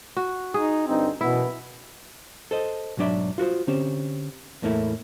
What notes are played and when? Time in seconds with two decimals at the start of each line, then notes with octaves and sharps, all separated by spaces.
0.16 F#4
0.54 D#4 G#4
0.88 G2 D3 C4 D#4
1.21 F#2 B2 E3 B3 E4
2.51 A4 C5 D#5
2.97 B1 G#2 F#3 D4 D5 E5
3.38 F4 F#4 A#4 C5
3.67 D3 C4 C#4 G4 C5
4.62 E2 A2 A3 A#3 E4